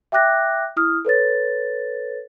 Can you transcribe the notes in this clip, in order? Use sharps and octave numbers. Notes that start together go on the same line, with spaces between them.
E5 G5 D6 F#6 A#6
E4 D#6 F6
A4 B4 C#5 A6